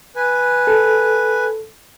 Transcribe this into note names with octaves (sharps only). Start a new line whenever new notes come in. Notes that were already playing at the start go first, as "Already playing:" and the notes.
B4 G#5
A4